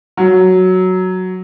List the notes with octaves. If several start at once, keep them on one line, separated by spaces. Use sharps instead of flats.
F#3